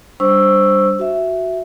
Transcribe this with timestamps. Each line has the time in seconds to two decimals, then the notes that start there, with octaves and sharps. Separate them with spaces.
0.20 G3 D4 C5 C#6 E6
0.99 F#4 E5